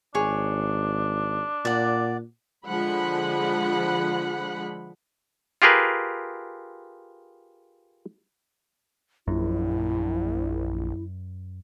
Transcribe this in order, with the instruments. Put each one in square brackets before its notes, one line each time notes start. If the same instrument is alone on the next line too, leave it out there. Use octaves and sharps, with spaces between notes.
[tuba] G#1 [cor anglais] D4 [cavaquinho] G#4 C#5
[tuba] A#2 [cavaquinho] D5 F#5
[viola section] D3 F3 G#3 F#5 B5
[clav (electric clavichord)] F4 G4 G#4 A#4 B4
[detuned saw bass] A#1 [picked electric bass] F#2 [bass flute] E4